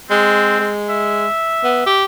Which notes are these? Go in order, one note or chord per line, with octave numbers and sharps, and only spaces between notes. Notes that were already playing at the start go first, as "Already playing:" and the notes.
G#3 C4
G#3
E5
B3
G4